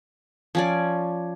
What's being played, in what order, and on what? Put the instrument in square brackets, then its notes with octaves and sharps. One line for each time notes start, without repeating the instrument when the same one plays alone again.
[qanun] F3 C#4 D5